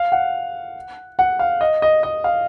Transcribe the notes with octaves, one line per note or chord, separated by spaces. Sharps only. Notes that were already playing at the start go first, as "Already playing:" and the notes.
Already playing: F5
F#5
F#5
F5
D#5
D#5
D#5
F5